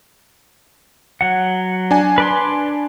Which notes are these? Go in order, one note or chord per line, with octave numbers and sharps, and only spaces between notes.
F#3 F#5
D4 G#5
B4 D5 C6